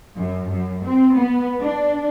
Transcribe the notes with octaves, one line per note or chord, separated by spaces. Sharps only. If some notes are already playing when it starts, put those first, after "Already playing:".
F#2
F#2
C4
B3
D4